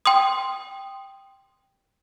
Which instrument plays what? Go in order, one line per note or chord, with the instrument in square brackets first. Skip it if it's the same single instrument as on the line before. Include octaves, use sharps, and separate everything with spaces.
[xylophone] G5 C6 D#6